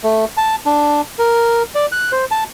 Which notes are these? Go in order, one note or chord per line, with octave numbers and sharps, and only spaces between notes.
A3
A5
D4
A#4
D5
F#6
C5
A5